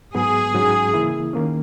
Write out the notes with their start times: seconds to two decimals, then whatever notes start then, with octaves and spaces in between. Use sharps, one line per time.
0.15 G#2 F#3 B3 G#4
0.54 G#2 F#3 C#4
0.93 C#3 E3 A#3 E4
1.33 D#3 A#3 C#4